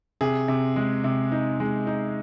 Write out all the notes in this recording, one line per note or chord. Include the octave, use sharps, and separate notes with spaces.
C3 G#4
C3
G#3
C3
D#4
G#3
D#4